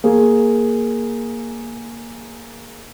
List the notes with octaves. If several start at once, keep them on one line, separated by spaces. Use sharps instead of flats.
A#3 G#4